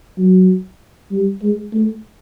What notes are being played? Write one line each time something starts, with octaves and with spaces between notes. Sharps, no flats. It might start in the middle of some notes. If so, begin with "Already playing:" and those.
F#3
G3
G#3
A3